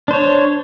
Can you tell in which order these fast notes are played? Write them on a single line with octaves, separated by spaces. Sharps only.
D4 C5 C#5